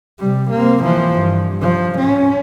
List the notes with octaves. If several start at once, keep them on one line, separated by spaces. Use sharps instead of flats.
C3 G3
A#3 C4
E3 F3
G2
F3
C#4